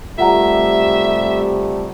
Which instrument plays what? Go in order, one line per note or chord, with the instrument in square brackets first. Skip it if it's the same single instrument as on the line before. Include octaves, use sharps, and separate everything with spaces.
[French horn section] C3 G3 A3 [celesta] F4 F#5 A#5 [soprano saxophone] E5